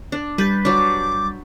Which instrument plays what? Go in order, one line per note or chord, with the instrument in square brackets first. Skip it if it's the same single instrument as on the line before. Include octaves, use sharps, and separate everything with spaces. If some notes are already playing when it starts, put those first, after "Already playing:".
[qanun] D4
[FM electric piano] G3 G6 A6 [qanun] B4
[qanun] F#3 D4 [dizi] D6